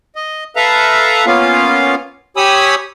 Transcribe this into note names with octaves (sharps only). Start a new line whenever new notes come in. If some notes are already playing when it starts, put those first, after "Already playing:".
D#5
A4 B4 E5 F5 A#5
A#3 B3 C#4 F4 F5
G4 C#5 G#5 B5 D#6 E6